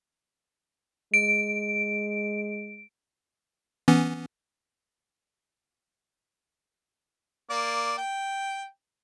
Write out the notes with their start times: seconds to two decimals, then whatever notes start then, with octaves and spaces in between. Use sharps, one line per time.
1.14 G#3 D7
3.88 E3 B3 C#4
7.50 A#3 D5
7.98 G5